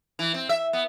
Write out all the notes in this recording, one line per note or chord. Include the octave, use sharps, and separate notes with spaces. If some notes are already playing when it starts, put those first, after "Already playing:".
E3
C4
E5
B3